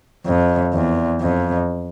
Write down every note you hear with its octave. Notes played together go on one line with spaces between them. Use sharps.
F2
E2
F2